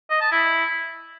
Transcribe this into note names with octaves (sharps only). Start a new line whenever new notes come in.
D#5
A5
E4